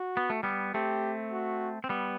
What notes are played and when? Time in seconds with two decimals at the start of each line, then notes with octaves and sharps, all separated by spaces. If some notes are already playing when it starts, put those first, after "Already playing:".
Already playing: F#4
0.17 B3
0.30 A3
0.43 G3 B3
0.74 A3 C4 G4
1.32 F#4
1.84 C4
1.89 G3 B3